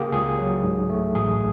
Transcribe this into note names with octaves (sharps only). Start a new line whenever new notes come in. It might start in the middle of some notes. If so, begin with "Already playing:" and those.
Already playing: C#3 A#3 G4 G#4
C#2 G#4
F#3
G#2
A3
A1 G#4